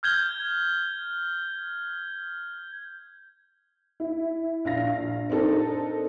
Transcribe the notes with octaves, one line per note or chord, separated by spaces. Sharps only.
F6 G6 G#6 G7
E4
A#1 F5 A#6
C4 D4 D#4 A4 A#4